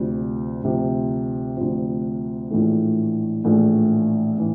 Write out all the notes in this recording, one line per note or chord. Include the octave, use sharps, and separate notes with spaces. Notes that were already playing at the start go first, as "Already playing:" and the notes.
Already playing: D2 C3 F3
D2 C3 F3
D2 C3 F3
A#1 A2 E3 A3
A#1 A2 E3 A3
A2 E3